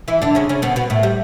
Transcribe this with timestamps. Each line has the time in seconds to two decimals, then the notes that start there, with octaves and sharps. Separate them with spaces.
0.08 E3 E4
0.22 D3 D4
0.35 C#3 C#4
0.49 C#3 C#4
0.62 B2 B3
0.76 B2 B3
0.90 A2 A3
1.03 G3